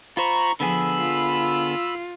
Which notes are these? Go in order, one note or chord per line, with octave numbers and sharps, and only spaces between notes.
F4 C5 A#5 B5 C#6
D3 F3 B3 G#4 B5 E6
F4